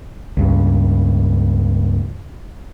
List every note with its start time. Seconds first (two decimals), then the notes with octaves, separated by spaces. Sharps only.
0.37 C#2 G2